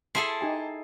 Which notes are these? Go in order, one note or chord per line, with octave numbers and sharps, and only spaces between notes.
E4 G#4 A4 A5 C6 C7
D#4 G4 G#5